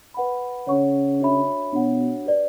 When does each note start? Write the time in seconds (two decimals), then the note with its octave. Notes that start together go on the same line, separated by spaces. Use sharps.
0.14 B4 F#5 B5
0.67 C#3 C#5 F#5 C#6
1.20 D4 F#4 C#5 E5 B5
1.73 B2 D4 F#4 C#5 F#5
2.25 G4 B4 D5